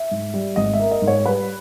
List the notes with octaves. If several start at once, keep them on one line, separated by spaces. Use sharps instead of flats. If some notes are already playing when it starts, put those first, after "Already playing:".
Already playing: E5
G#2
G3
G#1 D#5
E5
A#3
D#5
G#2
C#5
G3 B4